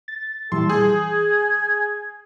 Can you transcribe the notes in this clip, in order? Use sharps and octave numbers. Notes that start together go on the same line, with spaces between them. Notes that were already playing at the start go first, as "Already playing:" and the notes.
A6
A#2 E3 G3 A4 C6
G#4 G#5 G6